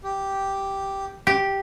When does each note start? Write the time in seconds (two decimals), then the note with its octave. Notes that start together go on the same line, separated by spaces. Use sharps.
0.03 G4
1.27 G4